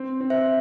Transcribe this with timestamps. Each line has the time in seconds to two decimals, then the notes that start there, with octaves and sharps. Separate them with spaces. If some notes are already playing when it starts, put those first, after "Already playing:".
Already playing: C4
0.21 C4
0.30 C5 E5